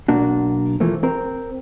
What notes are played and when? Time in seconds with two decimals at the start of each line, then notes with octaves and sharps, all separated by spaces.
0.08 B1 A#3 D4 F#4
0.80 E3 F3 A3 A#3
1.03 C4 A#4